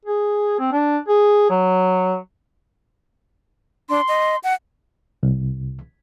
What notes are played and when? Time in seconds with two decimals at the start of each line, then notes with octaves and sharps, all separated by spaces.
0.05 G#4
0.60 C4
0.72 D4
1.08 G#4
1.50 F#3
3.89 D4 C6
4.08 D#5
4.44 F#5
5.23 C2